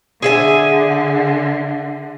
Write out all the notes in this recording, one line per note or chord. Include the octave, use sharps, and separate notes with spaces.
D3 G#4 E5 G#5